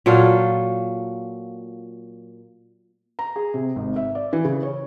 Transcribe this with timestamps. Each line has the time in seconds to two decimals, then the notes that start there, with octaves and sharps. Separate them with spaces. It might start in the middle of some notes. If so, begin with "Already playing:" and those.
0.06 A#2 F#3 F4 A4
3.19 A#5
3.36 G#4
3.54 C3
3.76 G#1
3.96 E5
4.15 D5
4.33 E3
4.45 C#3
4.63 C#5